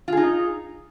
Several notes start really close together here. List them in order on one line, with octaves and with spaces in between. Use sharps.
F4 G#4 D#4